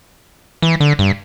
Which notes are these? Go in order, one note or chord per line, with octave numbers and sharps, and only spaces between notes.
E3
D3
G2